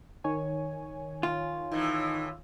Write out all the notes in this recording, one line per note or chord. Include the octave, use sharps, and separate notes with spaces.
D#3 C#5 G#5
F4
A2 E3 D#4